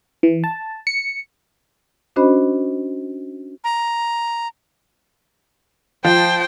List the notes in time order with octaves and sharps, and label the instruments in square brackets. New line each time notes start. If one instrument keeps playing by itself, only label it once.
[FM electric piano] E3
A5
C#7
[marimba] C#4 D4 F#4 C5 D#5 B5
[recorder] A#5
[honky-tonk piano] F3 [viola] C5 G5